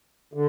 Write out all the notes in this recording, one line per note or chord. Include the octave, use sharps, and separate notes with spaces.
D3